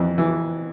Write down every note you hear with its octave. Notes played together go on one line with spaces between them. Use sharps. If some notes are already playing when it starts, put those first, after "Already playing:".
Already playing: F2 E3
E3